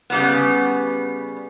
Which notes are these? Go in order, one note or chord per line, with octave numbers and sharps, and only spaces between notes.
C#3 G3 B3